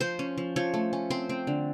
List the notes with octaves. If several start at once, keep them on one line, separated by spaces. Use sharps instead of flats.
F3 C5
C#4
F3
F3 C#5
A3
C#4
C4 C5
C4
D3